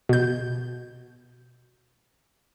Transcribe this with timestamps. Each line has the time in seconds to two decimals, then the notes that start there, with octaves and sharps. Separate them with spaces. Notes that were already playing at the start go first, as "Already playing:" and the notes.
0.09 B2 G6